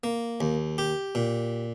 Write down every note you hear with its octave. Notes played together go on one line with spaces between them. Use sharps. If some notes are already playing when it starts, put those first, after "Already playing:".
A#3
D#2
G4
A#2